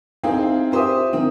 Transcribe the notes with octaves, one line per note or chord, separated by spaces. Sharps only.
C4 D#4 E4 G#4 F5 G5
F4 G4 C5 E5 D#6
D#3 C4